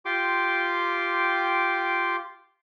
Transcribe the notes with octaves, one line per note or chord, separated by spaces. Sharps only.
F4 G4 G5 C6 D6